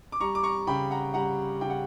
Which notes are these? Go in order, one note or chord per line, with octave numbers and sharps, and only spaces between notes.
D6
G3 A#5 C#6
D6
A#5 C#6
C#3 G5 B5
F#5 A#5
G3 F#5 A#5
C#3 G5
F#5